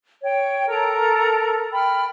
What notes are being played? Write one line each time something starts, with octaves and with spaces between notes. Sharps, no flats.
C#5 G5
A4 A#4 A#5
G5 B5 F6